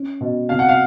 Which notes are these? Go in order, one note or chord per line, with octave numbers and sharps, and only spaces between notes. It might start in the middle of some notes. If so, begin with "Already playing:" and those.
Already playing: C#4
B2
C3 F5
F#5
F5